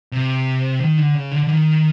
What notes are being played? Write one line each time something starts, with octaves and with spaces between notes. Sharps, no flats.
C3
D#3
D3
C#3
D3
D3
D#3